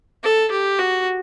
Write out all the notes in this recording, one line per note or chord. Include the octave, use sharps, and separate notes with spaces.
A4
G4
F#4